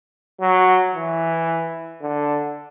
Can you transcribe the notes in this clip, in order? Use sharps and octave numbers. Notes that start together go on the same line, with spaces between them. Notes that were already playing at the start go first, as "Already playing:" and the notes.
F#3
E3
D3